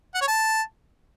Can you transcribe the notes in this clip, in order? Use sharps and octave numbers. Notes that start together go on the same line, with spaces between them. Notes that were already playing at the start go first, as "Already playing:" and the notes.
F#5
C#5
A5